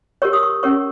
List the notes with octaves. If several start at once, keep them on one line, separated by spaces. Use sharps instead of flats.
G4 A#4 C#5 C#6
D#6
C#6
C#4 G4 A#4 C#5 C#6